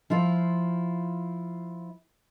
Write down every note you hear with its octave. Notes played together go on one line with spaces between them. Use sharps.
F3 E4 F4